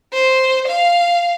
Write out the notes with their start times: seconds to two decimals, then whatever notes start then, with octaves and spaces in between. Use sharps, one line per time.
0.13 C5
0.68 F5